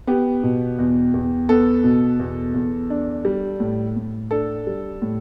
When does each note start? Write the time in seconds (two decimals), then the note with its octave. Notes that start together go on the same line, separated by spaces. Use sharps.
0.07 B3 G4
0.43 B2
0.79 E2
1.14 E2
1.49 B3 A4
1.84 B2
2.20 E2
2.54 E2
2.90 D4
3.25 G3
3.60 A2
3.96 A2
4.31 D4 A4
4.67 G3
5.02 A2